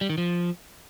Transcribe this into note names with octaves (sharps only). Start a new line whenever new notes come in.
G3
D#3
F3